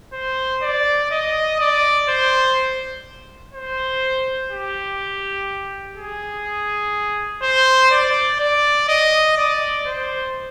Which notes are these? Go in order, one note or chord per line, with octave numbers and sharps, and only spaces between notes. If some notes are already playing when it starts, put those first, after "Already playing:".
C5
D5
D#5
D5
C5
C5
G4
G#4
C5
D5
D5
D#5
D5
C5